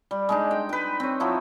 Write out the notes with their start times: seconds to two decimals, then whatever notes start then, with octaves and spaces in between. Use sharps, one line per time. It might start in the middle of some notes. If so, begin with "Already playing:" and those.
0.11 G3
0.29 G#3 D4 D#4
0.51 G5
0.69 B4 G5
1.00 C4 C#5
1.20 F3 F#3 E4